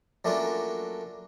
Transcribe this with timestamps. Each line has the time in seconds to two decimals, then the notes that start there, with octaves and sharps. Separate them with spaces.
0.25 F#3 A3 A#3 C#4 D4 F4